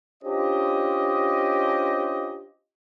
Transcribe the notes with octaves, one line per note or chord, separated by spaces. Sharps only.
C#4 D4 F4 G4 C5 D#5